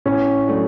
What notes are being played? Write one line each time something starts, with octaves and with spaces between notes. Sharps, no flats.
A2 C#4
F#3 A3 D4